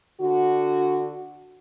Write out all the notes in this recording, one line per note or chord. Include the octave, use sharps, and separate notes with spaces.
D3 F#4